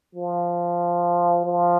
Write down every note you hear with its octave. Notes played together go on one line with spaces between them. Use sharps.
F3
F3